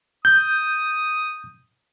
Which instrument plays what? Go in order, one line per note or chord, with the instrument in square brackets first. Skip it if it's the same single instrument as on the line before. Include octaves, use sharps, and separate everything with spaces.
[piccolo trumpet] D#6 [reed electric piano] G6